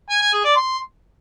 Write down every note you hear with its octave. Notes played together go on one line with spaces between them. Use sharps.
G#5
G#5
G#4
D5
C6